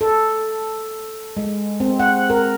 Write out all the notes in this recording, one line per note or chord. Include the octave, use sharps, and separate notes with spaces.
A4
G#3
C4
F#5
A#4